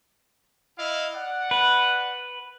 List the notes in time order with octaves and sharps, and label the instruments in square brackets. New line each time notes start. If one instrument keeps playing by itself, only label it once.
[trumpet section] E4 D#5 F5
D5 F#5
[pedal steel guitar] B4